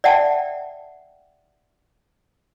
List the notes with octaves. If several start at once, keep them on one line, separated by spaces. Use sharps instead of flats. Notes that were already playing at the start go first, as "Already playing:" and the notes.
D5 E5 F#5 G5 A5